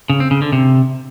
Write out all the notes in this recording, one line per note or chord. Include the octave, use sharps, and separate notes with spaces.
C#3
C4
C#3
D3
C3